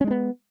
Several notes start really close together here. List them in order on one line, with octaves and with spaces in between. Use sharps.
C#4 G#3 D4 B3